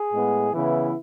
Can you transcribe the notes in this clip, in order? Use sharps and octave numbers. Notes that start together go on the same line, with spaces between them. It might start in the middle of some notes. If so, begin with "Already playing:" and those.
Already playing: G#4
A2 G#3 B3
C#3 E3 B3 E4